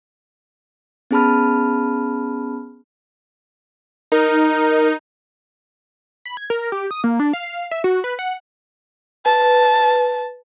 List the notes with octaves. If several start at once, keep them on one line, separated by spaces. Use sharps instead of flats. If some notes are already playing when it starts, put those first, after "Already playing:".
B3 C#4 G#4 A5 B5 F6
D#4 A#4
B5
G#6
A#4
G4
D#6
A#3
D4
F5
E5
F#4
B4
F#5
B4 A5